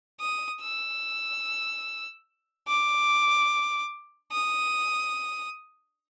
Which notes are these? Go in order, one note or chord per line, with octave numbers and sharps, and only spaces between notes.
D#6
E6
D6
D#6